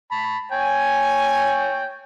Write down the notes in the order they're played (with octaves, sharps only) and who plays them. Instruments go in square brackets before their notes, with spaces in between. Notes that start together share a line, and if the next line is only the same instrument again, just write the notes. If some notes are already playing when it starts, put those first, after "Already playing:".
[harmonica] A5 B5
[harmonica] C#5 G5 [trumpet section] G#5